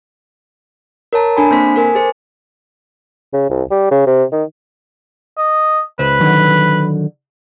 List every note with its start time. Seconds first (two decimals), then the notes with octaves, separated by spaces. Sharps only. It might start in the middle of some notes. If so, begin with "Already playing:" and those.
1.13 A#4 C#5 A5 A#5
1.36 D4 A4 G#5 B5
1.51 A#3 C4 C5 B6
1.76 A4 A#4 G#5
1.95 G#4 C5
3.33 C#3
3.50 C2
3.71 G3
3.91 C#3
4.07 C3
4.32 D#3
5.37 D#5
5.99 C#2 B4 C5
6.21 D3 D#3 F#3